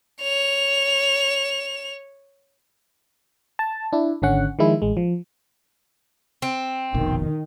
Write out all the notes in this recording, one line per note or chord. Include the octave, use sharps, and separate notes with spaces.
C#5 F7
A5
D4 E4
G#1 D3 C#4 F#5
D#3 F3 G#3 E4
A1 G#3
F3
C4
F1 A#1 B2 D#3